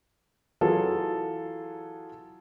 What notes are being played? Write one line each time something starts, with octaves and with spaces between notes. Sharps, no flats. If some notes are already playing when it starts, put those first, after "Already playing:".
E3 F#3 F4 G#4 A4